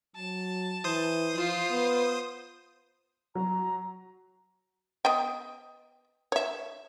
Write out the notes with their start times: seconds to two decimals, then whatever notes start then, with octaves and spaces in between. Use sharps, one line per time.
0.16 F#3 A5
0.84 E3 C5 D#6
1.35 F3 F4
1.70 B3
3.35 F#3 A#5
5.05 B3 D#5 G5
6.32 C#5 E5